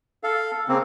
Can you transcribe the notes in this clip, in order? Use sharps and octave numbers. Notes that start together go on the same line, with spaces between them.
A4 F5
C#3 A#3 C4